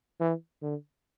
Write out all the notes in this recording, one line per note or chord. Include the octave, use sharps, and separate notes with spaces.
E3
D3